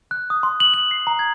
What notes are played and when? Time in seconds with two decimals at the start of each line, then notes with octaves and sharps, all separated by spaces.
0.11 F#6
0.30 D#6
0.43 C6
0.60 F#7
0.74 F#7
0.91 C7
1.07 A#5
1.19 G#6